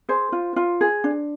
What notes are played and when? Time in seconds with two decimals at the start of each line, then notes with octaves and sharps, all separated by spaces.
0.09 G#4 C5
0.32 F4
0.56 F4
0.81 G#4
1.04 D4